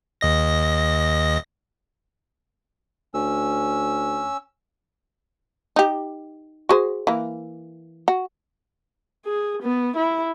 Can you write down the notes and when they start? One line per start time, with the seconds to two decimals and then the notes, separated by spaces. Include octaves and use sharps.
0.21 D#2 D#5 A#6
3.14 D2 C#4 E6
5.76 D#4 G4
6.69 F#4 G#4 C5
7.07 E3 A#3
8.08 F#4
9.26 G#4
9.63 B3
9.97 E4